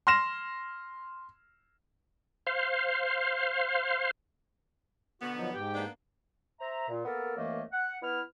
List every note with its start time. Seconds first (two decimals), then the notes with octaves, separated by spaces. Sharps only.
0.07 C6 F6 A#6 E7
2.47 C5 F5
5.22 B2 D3 B3 F#4
5.36 F3 F#3 D#4
5.54 G#2 G4 G5
5.75 A#3 B3 D4
6.60 C5 E5 A#5
6.88 A#2
7.05 A#3 B3 A4 A#4
7.36 C2 F#2 E3 A3 A#3 D#5
7.72 F#5
8.02 B3 E4 F6